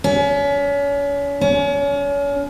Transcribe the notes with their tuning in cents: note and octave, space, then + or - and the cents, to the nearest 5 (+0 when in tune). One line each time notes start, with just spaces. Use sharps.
C#4 +35
C#4 +35